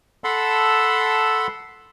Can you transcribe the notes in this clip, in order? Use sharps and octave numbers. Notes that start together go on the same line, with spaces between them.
A4 F#5 A5 B5 C6 E6